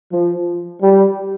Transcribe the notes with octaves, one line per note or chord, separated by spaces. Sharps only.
F3
G3